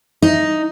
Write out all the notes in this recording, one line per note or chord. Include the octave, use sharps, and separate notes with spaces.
D#4